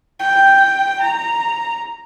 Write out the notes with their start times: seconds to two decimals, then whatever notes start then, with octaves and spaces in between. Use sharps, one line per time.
0.20 G5
1.01 A#5